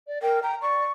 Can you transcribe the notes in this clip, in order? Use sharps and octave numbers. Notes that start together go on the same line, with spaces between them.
D5
A#4 G5
G5 A#5
D5 C#6